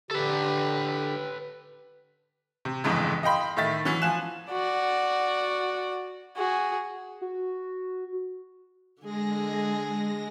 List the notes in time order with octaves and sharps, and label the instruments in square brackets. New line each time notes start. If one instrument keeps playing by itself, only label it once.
[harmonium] D3 G4 [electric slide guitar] A4 B4
[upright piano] C3
G1 F2 G#2 C#3 E3
D#5 F5 G5 B5 C6
A2 D#3 E5 A6
E3 F#3 C#4
F3 F5 G#5 F#6 E7
[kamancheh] F#4 D5
F#4 G#4
[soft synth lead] F#4
[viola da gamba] D3 G#4 [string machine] G#3 A#6